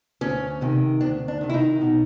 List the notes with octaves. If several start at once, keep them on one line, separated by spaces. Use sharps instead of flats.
D2 C#4
C3 D#3
D2 D4
D4
C3 D#3
E4
D#4
B2